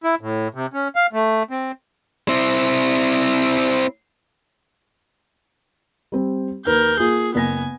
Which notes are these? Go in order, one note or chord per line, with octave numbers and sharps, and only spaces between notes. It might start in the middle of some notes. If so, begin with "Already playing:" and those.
E4
A2
C3
C#4
F5
A3
C4
C4 E4
G3 C4
D#2 A#4 B4 G6
A#3 F4 G#4
F#1 B3 G#5 A#6